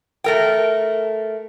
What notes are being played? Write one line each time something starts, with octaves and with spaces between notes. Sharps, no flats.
A3 A#4 G5